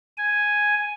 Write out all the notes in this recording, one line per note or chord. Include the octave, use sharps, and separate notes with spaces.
G#5